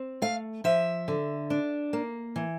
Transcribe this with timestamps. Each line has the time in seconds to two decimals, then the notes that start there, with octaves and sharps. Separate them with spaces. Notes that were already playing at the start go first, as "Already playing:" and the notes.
Already playing: C4
0.22 A3 F5
0.64 F3 E5
1.08 D3
1.50 D4
1.93 A#3
2.36 E3